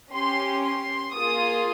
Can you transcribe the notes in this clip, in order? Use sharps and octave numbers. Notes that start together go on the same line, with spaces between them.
C#4 G4 C6
C6
A#3 F4 G#4 D#6